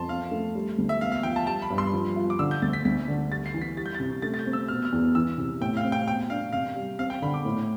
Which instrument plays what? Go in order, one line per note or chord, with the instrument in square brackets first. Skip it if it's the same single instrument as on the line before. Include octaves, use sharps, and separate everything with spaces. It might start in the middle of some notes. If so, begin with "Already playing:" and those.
Already playing: [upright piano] F2 [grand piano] A5 C6
[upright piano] C4 [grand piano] F5
[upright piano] A3
G3
D2
[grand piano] E5
[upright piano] B3 [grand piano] F5
[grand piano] F5
[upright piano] F3 [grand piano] G5
[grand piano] A5
[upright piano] G3 [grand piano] A5
[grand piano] B5
[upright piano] G2
[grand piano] C6
[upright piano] F3
F4
[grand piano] D6
[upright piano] D3 [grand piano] E6
[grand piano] G6
[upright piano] D2 [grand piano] A6
[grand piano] B6
[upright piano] D2 [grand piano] B6
[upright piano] D3
[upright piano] G3 [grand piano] A6
[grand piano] C7
[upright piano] E3
[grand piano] B6
[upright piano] G3 [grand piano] A6
[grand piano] G6
A6
[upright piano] C3
[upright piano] A3 [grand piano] A6
[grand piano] A6
G6
[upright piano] C4
[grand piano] E6
[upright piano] B2 [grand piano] F6
[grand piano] F6
[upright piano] E2
[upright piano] E3 [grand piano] E6
[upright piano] C3
[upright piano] A2 [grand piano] G5
[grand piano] F5
[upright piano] C4
[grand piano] G5
[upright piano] B2 [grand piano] G5
[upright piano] D4 [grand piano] F5
[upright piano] C3 [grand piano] F5
[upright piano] G3
[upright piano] C4 [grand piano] F5
[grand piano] G5
[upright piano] D3 [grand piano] B5
[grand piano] D6
[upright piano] A2